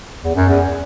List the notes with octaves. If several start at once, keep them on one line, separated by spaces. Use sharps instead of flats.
E2
F#2
E2